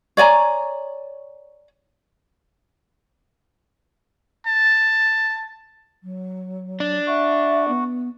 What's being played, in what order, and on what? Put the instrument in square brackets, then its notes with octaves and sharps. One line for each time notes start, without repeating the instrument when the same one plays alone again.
[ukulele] C#5 D5 G#5 A#5
[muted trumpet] A5
[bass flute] F#3
[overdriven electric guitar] D4
[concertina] F#4 [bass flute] E5
[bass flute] B3